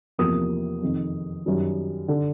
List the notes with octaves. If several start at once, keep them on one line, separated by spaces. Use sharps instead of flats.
E2 C3 F3 A#3 D#6
F2 C3 D#3
F#2 D#3 G3
D3